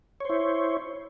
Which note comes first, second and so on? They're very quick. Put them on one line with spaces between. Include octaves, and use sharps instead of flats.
C#5 C5 E4